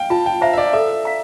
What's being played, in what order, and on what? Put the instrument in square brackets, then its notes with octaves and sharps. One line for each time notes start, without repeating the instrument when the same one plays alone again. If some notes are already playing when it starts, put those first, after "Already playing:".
Already playing: [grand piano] F5 G5
[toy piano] F4 [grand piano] A5
[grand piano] G5
[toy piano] C5 E5 A#5 [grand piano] F5
[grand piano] E5
D5
[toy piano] A4 [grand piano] E5
[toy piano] F5 A#5